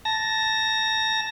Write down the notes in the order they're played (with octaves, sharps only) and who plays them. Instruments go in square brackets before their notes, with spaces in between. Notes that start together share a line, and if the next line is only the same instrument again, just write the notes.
[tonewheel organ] A5 A#6